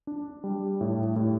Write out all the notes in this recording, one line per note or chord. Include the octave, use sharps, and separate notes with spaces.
D4
G3
A2
A2